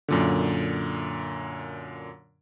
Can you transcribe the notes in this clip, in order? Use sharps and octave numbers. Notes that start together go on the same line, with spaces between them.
F#2 A#2 D3